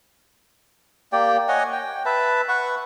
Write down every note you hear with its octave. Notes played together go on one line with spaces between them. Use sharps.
A#3 G4 D5 G5
C#5 D#5 F#5 G#5
G5
B4 E5 A5
B4 F#5 C#6